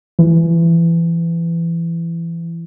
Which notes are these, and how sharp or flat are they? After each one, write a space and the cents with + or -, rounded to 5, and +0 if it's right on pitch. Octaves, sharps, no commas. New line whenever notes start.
E3 +25